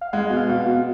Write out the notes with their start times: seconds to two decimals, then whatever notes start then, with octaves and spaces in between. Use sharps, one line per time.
0.01 F5
0.13 G#3 F#5
0.30 B2
0.36 F5
0.49 B2
0.61 F5
0.66 B2